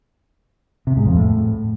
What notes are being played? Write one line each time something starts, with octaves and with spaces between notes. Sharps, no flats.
C3
G#2
F2
A2